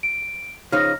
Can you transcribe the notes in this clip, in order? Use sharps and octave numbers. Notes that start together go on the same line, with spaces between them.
D7
C#3 F3 D#4 F6 A#6